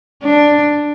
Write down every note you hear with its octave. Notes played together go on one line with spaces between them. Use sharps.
D4